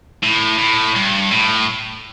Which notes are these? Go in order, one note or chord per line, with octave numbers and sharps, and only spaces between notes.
A2
A2
G2
A2